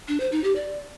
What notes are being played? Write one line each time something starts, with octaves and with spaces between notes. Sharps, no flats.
D4
C5
D#4
G4
D5